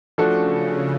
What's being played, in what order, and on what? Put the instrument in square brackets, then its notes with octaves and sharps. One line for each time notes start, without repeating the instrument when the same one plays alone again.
[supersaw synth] C#3 [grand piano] F3 A3 D4 F#4 A4